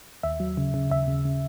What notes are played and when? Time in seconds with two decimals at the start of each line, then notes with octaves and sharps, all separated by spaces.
0.23 D#2 E5
0.40 F#3
0.57 C#3
0.74 C#3
0.90 D#2 E5
1.08 C#3
1.25 C#3